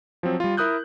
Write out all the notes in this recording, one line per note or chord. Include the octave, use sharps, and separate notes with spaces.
F3 F#3 C4
G3 F4
E4 A#4 D#6 F#6 G6